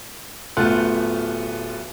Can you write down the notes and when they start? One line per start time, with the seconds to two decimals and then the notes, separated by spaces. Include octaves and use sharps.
0.57 D1 A3 B3 F4 F#6